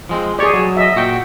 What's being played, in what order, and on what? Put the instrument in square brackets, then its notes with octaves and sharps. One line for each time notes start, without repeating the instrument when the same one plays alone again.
[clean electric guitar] F3 G#3 C4
[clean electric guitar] G4 C#5 [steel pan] G#4 D5
[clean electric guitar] F#3
[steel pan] D#5 E5
[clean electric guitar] A#2 F#4 G5